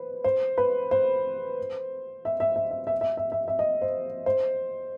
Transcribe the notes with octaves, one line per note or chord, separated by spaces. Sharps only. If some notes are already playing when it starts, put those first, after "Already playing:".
Already playing: B4 C5
C5
B4
C5
E5
E5
E5
E5
E5
E5
E5
E5
E5
D#5
C5
C5